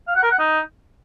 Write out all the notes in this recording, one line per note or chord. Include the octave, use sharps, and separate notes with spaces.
F5
F#5
A#4
F#5
D#4